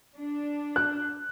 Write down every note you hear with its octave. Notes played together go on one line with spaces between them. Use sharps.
D4
F#6